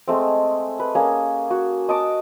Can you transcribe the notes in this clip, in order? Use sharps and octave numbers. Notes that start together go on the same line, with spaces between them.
G#3 A3 C4
B4
A#3 C#4 G#4
F#4
D#5 A5 D6